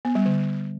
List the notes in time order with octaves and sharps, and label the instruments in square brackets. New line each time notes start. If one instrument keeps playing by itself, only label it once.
[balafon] B3
G3
D3